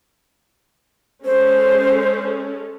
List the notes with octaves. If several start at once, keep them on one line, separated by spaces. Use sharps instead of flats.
G#3 C#4 A4 C5